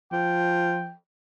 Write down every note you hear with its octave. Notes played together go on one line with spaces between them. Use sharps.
F3 G5